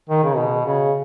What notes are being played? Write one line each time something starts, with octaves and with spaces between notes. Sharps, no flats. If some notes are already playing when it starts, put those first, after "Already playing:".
D#3
C#3
B2
C#3